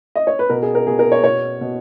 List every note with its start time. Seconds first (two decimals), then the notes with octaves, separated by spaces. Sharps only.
0.15 D#5
0.27 C#5
0.39 B4
0.49 B2 A#4
0.62 G#4
0.75 A#4
0.87 B2 G#4
0.99 A#4
1.12 C#5
1.23 B2 C#5
1.61 B2